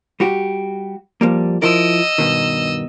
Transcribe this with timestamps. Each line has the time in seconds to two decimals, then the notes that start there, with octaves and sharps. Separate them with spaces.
0.20 G3 F#4 G4
1.21 F3 G3 A#3
1.62 F3 E4 A#4 D#5 E6
2.18 G2 B2 D#3